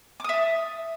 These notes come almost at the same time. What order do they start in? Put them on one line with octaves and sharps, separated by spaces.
D6 D#6 E5 A5